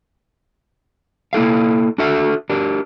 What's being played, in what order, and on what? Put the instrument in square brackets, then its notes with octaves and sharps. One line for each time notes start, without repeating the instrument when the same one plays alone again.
[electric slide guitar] A#3 E4 A4 F5
D4 F#4 A4 E5
D4 G4 A#4